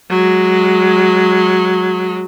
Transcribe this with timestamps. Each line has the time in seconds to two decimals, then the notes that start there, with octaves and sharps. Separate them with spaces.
0.10 F#3 G#3